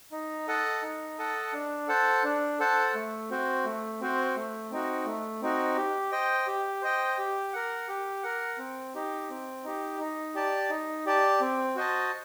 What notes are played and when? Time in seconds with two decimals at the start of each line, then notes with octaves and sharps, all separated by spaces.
0.12 D#4
0.47 A4 D#5 F#5 A5
0.82 D#4
1.18 A4 D#5 F#5 A5
1.53 D4
1.88 A4 C5 F#5 A5
2.24 D4
2.60 A4 C5 F#5 A5
2.94 A3
3.30 C4 F#4 C5
3.65 A3
4.01 C4 F#4 C5
4.36 A3
4.71 C4 D#4 F#4
5.06 A3
5.42 C4 D#4 F#4
5.76 G4
6.12 C5 D#5 G5
6.47 G4
6.82 C5 D#5 G5
7.18 G4
7.53 A#4 F#5
7.88 G4
8.23 A#4 F#5
8.58 C4
8.95 D#4 G4
9.30 C4
9.64 D#4 G4
10.00 D#4
10.35 G4 D5 A5
10.70 D#4
11.06 G4 D5 A5
11.41 C4
11.76 F#4 C5 D#5 A5